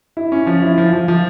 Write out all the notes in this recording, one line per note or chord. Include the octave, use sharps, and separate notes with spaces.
E4
C#4
F3
E4
F3
F3
F3